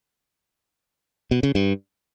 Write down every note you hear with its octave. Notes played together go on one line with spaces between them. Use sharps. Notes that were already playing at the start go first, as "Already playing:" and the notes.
B2
C#3
G2